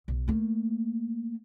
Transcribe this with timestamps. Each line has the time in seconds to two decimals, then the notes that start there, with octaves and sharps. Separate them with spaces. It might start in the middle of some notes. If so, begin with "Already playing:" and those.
0.08 B1
0.28 A3 A#3